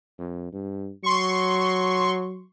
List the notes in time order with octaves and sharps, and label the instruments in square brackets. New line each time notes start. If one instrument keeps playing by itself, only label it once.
[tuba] F2
G2
[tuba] F#3 [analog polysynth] C6 C#6